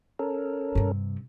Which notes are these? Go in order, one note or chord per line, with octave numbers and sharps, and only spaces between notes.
C#4 A4 A#4
G2 C3